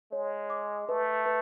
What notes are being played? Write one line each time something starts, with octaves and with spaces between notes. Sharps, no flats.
G#3 C#5
D6
A3 B4
B4